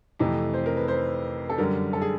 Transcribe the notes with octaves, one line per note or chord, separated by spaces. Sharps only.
F2 C3 E3 A3
C5
A#4
B4
C5
A4
F#2 D3 G3 A#4
A4
G#4